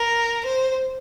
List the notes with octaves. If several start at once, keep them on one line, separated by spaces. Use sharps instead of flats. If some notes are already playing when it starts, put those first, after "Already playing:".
Already playing: A#4
C5